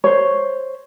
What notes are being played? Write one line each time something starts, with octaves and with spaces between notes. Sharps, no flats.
C5 C#5